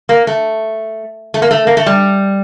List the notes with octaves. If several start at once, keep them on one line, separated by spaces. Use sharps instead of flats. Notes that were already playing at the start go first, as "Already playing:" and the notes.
A#3
A3
A3
A#3
A3
A#3
A3
G3